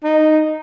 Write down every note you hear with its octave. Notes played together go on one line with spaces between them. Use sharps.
D#4